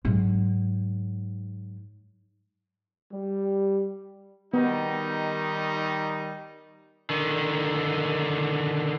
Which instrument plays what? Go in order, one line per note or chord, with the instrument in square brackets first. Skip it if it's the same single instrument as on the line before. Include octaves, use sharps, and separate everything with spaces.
[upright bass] G#2 F#3
[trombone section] G3
[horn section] D#3 G3 D#4 [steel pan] B3
[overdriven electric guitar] D3 D#3